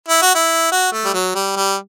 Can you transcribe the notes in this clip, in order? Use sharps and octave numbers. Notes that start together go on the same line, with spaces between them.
E4
F#4
E4
F#4
A3
G3
F#3
G3
G3